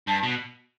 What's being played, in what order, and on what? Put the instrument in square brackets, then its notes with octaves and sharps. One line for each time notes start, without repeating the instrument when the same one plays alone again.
[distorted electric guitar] G2 [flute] A5
[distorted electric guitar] B2